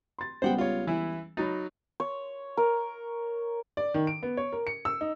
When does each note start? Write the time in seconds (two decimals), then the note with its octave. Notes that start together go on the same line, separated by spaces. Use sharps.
0.19 C6 A6
0.42 C#2 G3 B3 C5 F#5 G5
0.58 F4 C#5
0.87 E3 E4
1.37 F#3 D#4 B5 A6
2.00 C#5
2.57 A#4
3.77 D5
3.94 D#3
4.07 D7
4.23 B3
4.37 C#5
4.53 A#4
4.67 C#7
4.85 E6
5.01 D#4